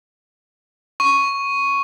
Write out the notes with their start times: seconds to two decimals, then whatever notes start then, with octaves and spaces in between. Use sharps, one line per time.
1.00 C#6